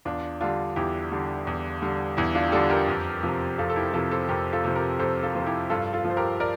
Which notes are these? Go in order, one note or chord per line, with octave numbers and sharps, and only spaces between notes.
E2 D4 F4
D3 G3 D4 F4
E2 E4 G4
D3 G3
E2
D3 G3
E2 E4
D4 F4
G4
D3 G3 F4 A4
G4 A#4
F2
C3 F3
F2 F4 A4
A4
E4 G4
C3 F3 F4 A4
A4 C5
F2 G4 A#4
F4 A4
C3 F3
G4 A#4
F2 A4 C5
F4 A4
C3 F3
E4 G4
G2 F4 A4
F4 A4
F3
C5
G4 A#4
A#4 D5